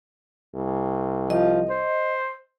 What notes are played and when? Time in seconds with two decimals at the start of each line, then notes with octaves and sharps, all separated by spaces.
0.55 C2
1.30 F3 D#5
1.70 C5